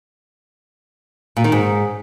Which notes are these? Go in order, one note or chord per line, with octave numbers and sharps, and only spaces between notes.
A#2
D#3
G#2